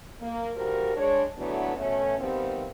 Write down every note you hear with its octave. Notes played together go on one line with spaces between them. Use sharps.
A#3
D3 F3 G3 F#4 A#4
G#3 D4 C#5
D3 E3 F#3 A3 B3 D4
B2 A3 C#4
C3 D#3 F3 G3 B3 C4